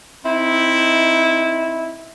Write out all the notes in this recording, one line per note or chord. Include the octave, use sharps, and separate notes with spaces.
C4 D#4 E4